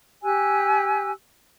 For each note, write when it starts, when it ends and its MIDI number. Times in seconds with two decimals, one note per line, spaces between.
0.23 1.11 67
0.23 1.11 80
0.23 1.11 88
0.23 1.11 90